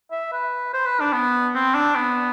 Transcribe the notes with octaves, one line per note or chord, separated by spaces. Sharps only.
E5
B4
C5
B4
D4
B3
C4
D4
B3